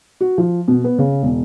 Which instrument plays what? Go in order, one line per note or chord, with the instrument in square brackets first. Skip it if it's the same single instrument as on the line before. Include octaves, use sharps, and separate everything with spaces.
[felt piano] F#4
F3
B2
B3
C#3
E1